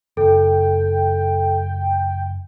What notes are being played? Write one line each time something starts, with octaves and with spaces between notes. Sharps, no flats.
F#1 A4 G5